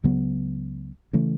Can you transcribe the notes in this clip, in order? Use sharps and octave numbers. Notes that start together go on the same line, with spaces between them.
C#2 C#3 F#3 B3
C#3 E3 A3